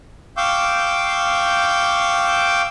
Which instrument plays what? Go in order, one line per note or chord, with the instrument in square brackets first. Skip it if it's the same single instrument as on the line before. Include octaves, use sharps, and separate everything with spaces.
[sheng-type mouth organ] F5 G5 C#6 D6 E6 G6